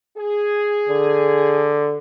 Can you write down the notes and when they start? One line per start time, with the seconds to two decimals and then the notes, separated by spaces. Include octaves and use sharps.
0.17 G#4
0.89 D3